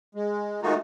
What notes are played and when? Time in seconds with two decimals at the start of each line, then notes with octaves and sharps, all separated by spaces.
0.15 G#3
0.63 D#3 G#3 A3 D#4 F4 F#4